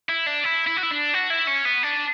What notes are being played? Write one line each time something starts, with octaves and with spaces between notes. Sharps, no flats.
E4
D4
E4
E4
F#4
E4
D4
F#4
E4
C#4
B3
D4